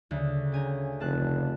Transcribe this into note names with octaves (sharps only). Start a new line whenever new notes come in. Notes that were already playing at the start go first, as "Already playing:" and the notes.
D2 C#3
C#3 G5 G#5 A#5
F1 C#3 A5 F#6